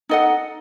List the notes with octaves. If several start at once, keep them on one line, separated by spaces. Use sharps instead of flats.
D#4 A4 D#5 F#5